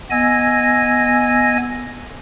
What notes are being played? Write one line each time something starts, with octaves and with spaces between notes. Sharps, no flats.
B3 D#5 G#5 E6 G#6 A#6